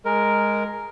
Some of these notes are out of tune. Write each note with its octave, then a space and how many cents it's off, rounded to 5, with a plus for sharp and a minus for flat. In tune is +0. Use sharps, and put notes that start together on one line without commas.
G#3 +0 A#4 +0